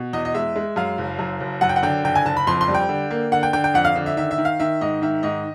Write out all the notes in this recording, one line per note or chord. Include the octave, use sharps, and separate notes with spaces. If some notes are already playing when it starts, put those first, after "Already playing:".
Already playing: B2
E2 D#5
D#5
G#3 E5
G#3
F#2 F5
F#1
F#2
F#1
F#2 F#5
G5
F#5
D3 G5
F#1 G5
G#5
F#1 A5
B5
F2 C6
C6
G3
G5
D3
A#3
D3 F#5
G5
D3 G5
G5
F2 F#5
F5
D3
E5
D#3 E5
E5
D#3
F5
D#3 E5
G#2 D#5
D#3 E5
G#2 D#5